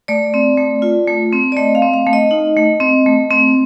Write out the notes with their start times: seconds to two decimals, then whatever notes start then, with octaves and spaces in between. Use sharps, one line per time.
0.08 A3 D5
0.34 C4
0.57 A3
0.82 F4
1.07 A3
1.33 C4
1.52 D5
1.57 A3 D#5
1.75 F5
1.82 C4
1.93 F5
2.07 A3
2.13 D#5
2.31 D#4
2.57 A3
2.80 C4
3.06 A3
3.30 C4